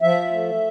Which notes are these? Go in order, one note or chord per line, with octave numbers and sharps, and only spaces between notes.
F3 E5
A3